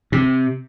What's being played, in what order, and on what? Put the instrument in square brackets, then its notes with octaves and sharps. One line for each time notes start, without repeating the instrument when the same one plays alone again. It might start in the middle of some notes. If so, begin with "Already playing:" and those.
[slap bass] C3